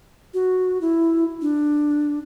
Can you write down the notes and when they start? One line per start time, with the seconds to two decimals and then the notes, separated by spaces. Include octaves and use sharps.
0.34 F#4
0.81 E4
1.42 D4